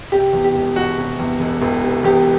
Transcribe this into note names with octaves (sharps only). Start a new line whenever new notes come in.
C3 G4
E2
G4
E1
E1 F#4
C3
E2
E1
E1
C3
E2 G4